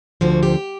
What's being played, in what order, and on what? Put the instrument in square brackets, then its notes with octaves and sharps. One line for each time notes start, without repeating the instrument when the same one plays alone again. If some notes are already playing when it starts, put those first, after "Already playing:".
[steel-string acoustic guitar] D2 D3 F3 F#4
G4